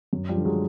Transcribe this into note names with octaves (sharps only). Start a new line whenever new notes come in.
F#2
F3 G3
D3
F#3 G#3